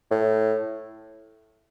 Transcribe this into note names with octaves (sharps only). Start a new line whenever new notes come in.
A2